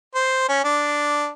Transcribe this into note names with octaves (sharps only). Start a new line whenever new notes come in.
C5
C#4
D4